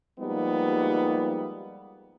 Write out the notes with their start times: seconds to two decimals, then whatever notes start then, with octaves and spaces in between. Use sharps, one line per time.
0.19 F3 G3 G#3 A#3 B3 D#4